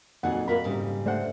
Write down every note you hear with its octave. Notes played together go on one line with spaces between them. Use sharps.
F2 A#2 F#3 D#4 G#4 F#5
A#3 F4 A#4 B5
G#2 C#3 G3
A3 D4 C5 F#5